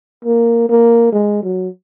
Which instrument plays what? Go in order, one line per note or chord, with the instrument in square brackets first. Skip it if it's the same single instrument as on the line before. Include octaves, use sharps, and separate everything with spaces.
[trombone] A#3
A#3
G#3
F#3